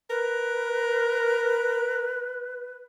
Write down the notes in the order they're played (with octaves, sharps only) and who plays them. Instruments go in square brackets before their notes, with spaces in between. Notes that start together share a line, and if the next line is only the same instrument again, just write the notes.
[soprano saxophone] A#4 [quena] B4